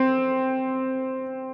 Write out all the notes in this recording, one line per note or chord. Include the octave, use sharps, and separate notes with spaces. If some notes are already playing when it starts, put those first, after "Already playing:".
Already playing: C4